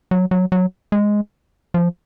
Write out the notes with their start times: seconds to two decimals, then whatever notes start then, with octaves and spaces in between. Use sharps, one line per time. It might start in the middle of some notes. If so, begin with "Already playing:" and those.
0.11 F#3
0.31 F#3
0.52 F#3
0.92 G#3
1.74 F3